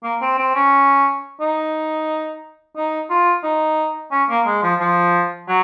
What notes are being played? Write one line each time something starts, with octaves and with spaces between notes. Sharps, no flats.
A#3
C4
C4
C#4
D#4
D#4
F4
D#4
C#4
A#3
G#3
F3
F3
F#3